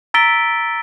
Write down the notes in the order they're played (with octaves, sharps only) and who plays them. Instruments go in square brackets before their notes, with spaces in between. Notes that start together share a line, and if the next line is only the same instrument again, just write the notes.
[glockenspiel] A#5 E6 A6 B6 D7 G7